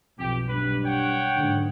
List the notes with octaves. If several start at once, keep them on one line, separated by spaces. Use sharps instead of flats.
B1 F2 G4
G2 B4
C#5 F#5 G5
F#1 G#2 D3